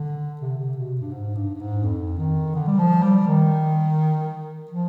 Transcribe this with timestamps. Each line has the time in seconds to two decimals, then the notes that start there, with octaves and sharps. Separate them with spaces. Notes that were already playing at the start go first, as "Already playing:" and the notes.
Already playing: D3
0.41 C3
0.58 C3
0.76 B2
1.01 G2
1.11 G#2
1.35 G2
1.55 G2
1.60 G#2
1.83 F2
2.19 D#3
2.55 D3
2.67 G3
2.79 F3
3.02 G3
3.27 D#3
4.71 F3